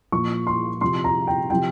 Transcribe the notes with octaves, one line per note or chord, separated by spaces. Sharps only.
A#2 F3 C#6
C6
C3 F3 C6
A#5
G5
C3 F3 G5